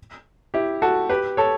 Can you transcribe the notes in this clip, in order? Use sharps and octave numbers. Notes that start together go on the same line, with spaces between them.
E4 G4
F#4 A4
G4 B4
A4 C#5